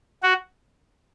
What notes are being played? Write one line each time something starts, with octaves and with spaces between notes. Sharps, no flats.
F#4